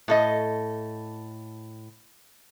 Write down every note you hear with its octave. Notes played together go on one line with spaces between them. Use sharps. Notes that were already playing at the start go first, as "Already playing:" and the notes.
A2 A4 D#5